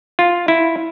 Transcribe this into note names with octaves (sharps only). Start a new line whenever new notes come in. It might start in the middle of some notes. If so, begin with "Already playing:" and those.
F4
E4